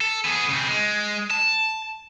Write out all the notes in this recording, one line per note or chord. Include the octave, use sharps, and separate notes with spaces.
A4
B3 G#4
C#3 C4
G#3
A5